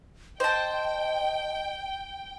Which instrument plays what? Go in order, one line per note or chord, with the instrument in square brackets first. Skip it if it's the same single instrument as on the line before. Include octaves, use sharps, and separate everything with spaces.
[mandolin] C5 A5 [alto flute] D#5 [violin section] G5